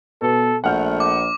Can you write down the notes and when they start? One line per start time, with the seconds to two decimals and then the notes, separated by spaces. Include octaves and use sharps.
0.22 B2 B3 A4
0.64 A#1 A3 F#5 F6 G6
1.00 D6